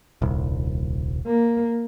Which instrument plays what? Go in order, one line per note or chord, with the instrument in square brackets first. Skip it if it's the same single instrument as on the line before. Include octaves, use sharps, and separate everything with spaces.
[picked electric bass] D#1 C2
[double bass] A#3